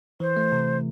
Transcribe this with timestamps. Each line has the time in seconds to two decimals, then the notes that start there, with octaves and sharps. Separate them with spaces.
0.20 E3 C5
0.37 A3
0.52 C3